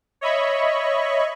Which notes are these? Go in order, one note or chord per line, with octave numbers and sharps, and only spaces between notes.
C#5 D#5 E5 B5 C#6